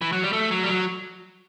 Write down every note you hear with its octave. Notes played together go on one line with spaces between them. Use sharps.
E3
F#3
G3
A3
F#3
G3
F#3